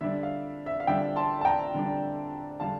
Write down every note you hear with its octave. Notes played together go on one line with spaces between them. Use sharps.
D3 G3 D4 E5
F5
E5
F5
D3 G3 D4 E5 G5
A5 C6
A5
G5 A#5
D3 G3 D4
D3 G3 D4 F5 A5